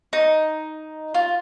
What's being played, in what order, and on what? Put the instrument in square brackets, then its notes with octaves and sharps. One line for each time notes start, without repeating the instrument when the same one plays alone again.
[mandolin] D#4
F4